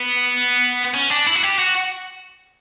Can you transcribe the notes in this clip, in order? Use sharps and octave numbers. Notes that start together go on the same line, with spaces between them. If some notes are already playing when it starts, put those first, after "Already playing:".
Already playing: B3
C#4
D4
E4
F#4
G4
F#4